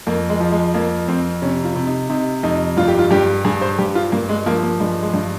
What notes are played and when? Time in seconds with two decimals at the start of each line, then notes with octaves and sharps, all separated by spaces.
0.07 F2 A#3
0.29 G#3
0.40 F3
0.52 G#3
0.74 F2 A#3
1.08 F2 C4
1.42 C3 C#4
1.64 F4
1.75 C3
1.87 D#4
2.10 C3 D#4
2.43 F2 D#4
2.77 G2 F4
2.88 G4
2.99 F4
3.11 G2 G4
3.44 G2 G#4
3.61 C5
3.78 G2 G4
3.95 F4
4.12 G2 A#3
4.29 G#3
4.46 F3 A#3
4.63 A#3
4.80 G2 G#3
5.02 G#3
5.14 G2